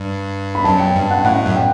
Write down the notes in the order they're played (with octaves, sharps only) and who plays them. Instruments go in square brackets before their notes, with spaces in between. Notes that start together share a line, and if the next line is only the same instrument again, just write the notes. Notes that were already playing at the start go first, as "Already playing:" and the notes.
Already playing: [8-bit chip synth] G2
[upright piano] B5
[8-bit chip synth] F#2 [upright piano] A5
[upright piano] G5
[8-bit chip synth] G2
[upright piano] F#5
[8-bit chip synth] A2 [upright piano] F#5
[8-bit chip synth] F#2
[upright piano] G5